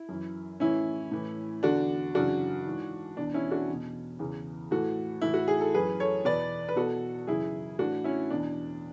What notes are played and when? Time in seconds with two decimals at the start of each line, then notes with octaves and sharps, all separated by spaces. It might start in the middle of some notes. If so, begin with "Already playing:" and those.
Already playing: E4
0.09 F#2 E3
0.60 A2 E3 C#4 E4
1.11 A2 E3
1.63 E2 D3 D4 F#4
2.15 F#2 C#3 E3 D4 F#4
2.67 G#2 E3
3.17 E2 B2 D4
3.34 C#4 E4
3.51 D4 F#4
3.69 E2 B2
4.19 E2 C#3 E3
4.71 A2 E3 F#4 A4
5.22 A2 E3 E4
5.34 F#4
5.48 G#4
5.61 A4
5.74 F#2 E3 G#4 B4
6.00 A4 C#5
6.25 E2 B2 B4 D5
6.69 B4
6.76 E2 B2 F#4 A4
7.27 F#2 C#3 E3 E4 G#4
7.79 A2 E3 D4 F#4
8.04 C#4 E4
8.30 E2 B2 D4